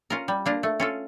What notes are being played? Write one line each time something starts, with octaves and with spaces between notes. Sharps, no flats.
C#4 F4 A#4
G3
A#3 D4 F4 A#4
A3
C#4 F4 A4